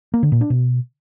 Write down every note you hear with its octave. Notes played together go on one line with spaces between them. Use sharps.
A#3
D3
A#2
D4
B2